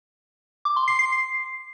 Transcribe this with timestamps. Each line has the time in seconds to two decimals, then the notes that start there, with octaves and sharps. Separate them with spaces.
0.65 D6
0.76 C6
0.88 C7
0.99 C7